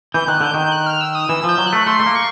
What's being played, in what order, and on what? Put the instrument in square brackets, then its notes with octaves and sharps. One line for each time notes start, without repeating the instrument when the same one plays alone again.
[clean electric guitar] E3 [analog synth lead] G6
[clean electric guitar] D#3 [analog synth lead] F#6
[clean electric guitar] D3 [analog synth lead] G6
[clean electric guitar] D#3 [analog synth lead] G6
[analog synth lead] F#6
F6
E6
D#6
[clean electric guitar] E3 [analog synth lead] E6
[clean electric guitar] F3
[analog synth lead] G6
[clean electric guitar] F#3
[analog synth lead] F#6
[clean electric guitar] A3
[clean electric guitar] A3 [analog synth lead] C6
[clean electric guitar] A3
A#3
[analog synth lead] C#6